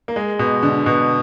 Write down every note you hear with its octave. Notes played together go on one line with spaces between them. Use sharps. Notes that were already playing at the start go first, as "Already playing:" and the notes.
A#3
G#3
B2
D3
B2